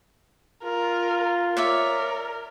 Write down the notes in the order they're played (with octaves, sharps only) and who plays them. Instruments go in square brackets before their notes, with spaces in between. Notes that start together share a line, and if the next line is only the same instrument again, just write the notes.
[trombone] F4 [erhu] A#4
[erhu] A#4 [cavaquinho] C#5 D5 E5